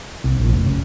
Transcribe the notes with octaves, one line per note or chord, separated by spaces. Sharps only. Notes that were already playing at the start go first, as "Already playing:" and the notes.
C2
A#1
F1
C#3